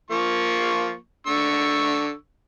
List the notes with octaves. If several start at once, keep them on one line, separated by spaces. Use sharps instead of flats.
F3 A#3 C#6
D3 C#6 E6